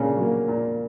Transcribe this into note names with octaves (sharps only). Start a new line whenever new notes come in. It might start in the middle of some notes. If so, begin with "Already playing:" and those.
Already playing: A#2 C#3 A#3 C#4 D4
F#3 A#3
A#2